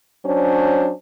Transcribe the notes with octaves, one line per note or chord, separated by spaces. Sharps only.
F#3 C#4 D4 C5